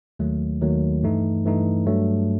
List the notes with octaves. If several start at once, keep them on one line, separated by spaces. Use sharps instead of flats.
D#2 D#3 F#3 A3
D#2 D#3 F#3 A3
G2 E3 A3 D#4
G2 E3 A3 D#4
G2 F#3 A3